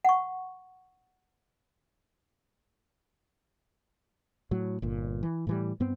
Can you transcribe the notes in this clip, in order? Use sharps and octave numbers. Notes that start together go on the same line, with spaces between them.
F#5 C#6
A2 F#3
G1 A#2
E3
A2 E3 G3
G2 B3 C4